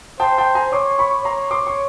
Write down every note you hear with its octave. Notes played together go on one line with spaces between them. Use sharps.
C5 G5 A5
G5 A5
G#5 A#5
C#5 C6 D6
B5 C#6
C#5 A#5 C6
C6 D6
C#6